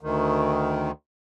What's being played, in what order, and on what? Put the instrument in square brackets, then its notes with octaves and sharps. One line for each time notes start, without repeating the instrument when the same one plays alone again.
[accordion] D2 D#3